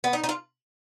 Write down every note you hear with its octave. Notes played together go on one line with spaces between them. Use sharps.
B3
D#4
D#4
F4